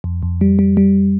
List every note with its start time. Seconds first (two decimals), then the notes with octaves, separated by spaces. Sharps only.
0.04 F2
0.23 F2
0.41 G3
0.59 G3
0.77 G3